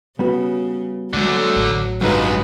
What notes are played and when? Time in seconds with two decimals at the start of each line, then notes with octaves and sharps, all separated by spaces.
0.19 C#3 G3 B3 F#4
1.13 D2 D3 F#3 G#3 A#3
1.56 A1
2.01 C#2 G2 F#3 G#3 D#4 B4 F5